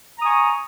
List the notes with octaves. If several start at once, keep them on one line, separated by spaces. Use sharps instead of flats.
G#5 A#5 C#6 D#6